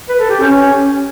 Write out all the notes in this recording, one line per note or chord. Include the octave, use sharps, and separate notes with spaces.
B4
A4
G4
C#4